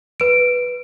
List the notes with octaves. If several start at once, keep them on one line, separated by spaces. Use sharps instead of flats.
B4 D7